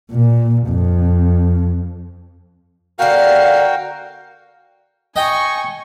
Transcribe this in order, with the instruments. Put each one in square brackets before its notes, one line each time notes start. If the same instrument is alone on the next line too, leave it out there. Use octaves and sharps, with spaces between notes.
[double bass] A#2
F2
[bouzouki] D3 B3 [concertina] F#4 A#4 G5 [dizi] F5
[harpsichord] D#5 G5 A#5 [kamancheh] G#5 C#6